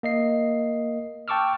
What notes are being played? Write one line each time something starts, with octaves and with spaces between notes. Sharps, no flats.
A#3 D#5 C7
G5 A5 C#6 D6 E6 F6